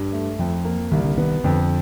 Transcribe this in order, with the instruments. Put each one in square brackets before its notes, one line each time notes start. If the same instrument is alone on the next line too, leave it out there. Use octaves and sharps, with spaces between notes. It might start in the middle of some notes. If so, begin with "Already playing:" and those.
Already playing: [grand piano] G2
A3
[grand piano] F2 [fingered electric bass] F3
[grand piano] A#3
[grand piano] C2 [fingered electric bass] D#3
[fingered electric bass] D3
[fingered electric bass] D#3 [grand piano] B3
[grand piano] F2 [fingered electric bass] D3